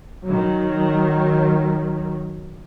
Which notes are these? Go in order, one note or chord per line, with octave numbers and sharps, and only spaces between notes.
D#3 F#3